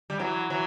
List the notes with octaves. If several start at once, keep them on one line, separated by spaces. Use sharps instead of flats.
G3
E3 F#3
E3 F#3